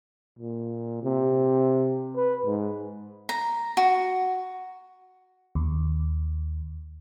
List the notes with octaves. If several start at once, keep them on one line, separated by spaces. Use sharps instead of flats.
A#2
C3
B4
G#2
A#5
F#4
D#2